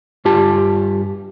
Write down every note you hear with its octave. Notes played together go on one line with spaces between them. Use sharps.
G2 F4 G4 A5